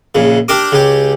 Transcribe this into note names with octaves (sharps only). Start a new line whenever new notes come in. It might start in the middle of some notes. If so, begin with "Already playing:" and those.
A#1 C#3
D4 G4 A#4 D6
C#2 G4